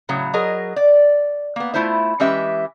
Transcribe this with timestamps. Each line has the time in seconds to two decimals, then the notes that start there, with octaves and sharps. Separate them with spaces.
0.09 A2 C#3 F#3
0.34 F#3 G#4 A#4 D#5
0.76 D5
1.56 A#3 B3
1.74 A3 E4 F4 C5 E5
2.20 E3 G#3 C#4 G4 B4 E5